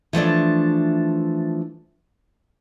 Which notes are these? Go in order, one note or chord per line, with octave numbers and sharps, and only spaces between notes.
E3 F3 A3 D4